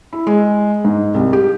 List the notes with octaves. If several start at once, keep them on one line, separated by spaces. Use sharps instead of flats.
E4
G#3
G#2
C2
G4